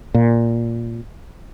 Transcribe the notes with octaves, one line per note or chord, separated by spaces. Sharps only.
A#2